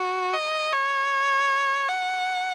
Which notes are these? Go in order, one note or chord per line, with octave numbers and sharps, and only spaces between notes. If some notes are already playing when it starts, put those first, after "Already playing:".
Already playing: F#4
D#5
C#5
F#5